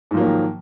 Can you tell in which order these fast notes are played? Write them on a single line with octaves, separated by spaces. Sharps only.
G#2 F3 A#3 F#3 D#3